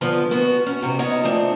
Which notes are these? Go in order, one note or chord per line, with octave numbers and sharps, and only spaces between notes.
G2 D3 F3 B3
B3 F#4
C#4 F#5
F2 C3 F#4
B3 D#4 C#5 D#5 F#5
F3 A3 C4 D4